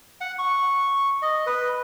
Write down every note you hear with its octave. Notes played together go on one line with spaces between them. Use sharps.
F#5
C#6
D#5
B4